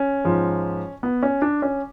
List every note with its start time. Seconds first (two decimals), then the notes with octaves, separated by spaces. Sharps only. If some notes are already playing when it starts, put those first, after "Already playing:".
Already playing: C#4
0.25 G#2 F3
1.03 B3
1.23 C#4
1.42 D4
1.62 C#4